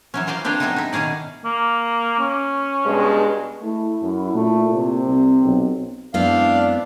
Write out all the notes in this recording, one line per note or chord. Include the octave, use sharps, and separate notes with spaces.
E3 F#3 C#4
F4 A#4 C5 D5 F5
C4 D4 B4 C#5 G5
F#3 G#3 A3 B3 C4 D#4
D#4 E5
B2 D#3 C#4 G#4 D5
A#3
C#4
G2 B2 G#3
A3 E4
F#2
A#2 A3
C3
C2 C4
B1
F#2 G#3 B3 C4 D4 E4 F5